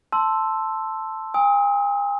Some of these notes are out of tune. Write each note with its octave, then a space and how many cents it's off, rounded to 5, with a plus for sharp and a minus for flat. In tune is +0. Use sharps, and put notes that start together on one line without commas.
A5 +0 C6 +0 E6 +0
G#5 -45 D#6 +40